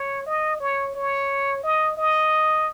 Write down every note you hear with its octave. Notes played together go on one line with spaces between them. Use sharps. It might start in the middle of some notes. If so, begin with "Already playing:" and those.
Already playing: C#5
D#5
C#5
C#5
D#5
D#5